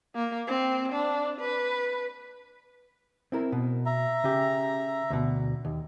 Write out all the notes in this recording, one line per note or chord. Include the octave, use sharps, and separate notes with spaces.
A#3
C4
D4
B4
C4 E4 A#4
B2
E5 A#5
C#3 G4
D2 B2
D#2